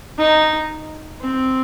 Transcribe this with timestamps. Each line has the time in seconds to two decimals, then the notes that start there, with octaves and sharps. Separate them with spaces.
0.18 D#4
1.21 C4